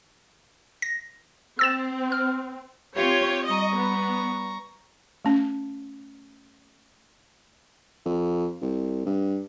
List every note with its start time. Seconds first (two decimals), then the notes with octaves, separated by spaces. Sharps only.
0.82 A#6
1.59 C4 E6 A6 E7
2.12 F6
2.96 C4 F4 G4 C#5
3.47 G3 D#5 A#5 C#6
3.75 B3
5.25 A3 C#4
8.06 F2
8.62 C2
9.06 G2